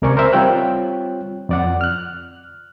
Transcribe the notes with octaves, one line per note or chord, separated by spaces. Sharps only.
C#2 C3 A#4 D5 G#5 C#6
A#4 C5 E5
G3 C4 F4 C#5 G5 F#6
F2 D5 F#5
F6 F#6